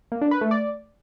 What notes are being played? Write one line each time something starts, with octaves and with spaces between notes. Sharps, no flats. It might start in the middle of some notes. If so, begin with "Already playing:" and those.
A#3
D4
B4
A3
D5